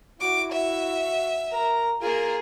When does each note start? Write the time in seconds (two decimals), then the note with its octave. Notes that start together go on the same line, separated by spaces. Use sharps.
0.20 E4 F#4 D6
0.52 F#4 E5
1.52 A#4 A#5
2.02 A#3 F4 G#4 A#4